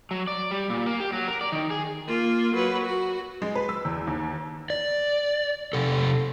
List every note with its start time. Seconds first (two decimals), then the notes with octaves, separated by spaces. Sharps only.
0.11 F#3
0.28 D5
0.51 G3
0.70 A#2
0.86 A#3
1.00 G4
1.13 F#3
1.28 A#4
1.41 D5
1.52 D#3
1.71 G#4
2.07 A#3 F4
2.55 F#3 B4
2.85 F#4
3.42 G#3
3.55 B4
3.69 E6
3.85 E2
4.07 D#2
4.70 D5
5.73 C3 A4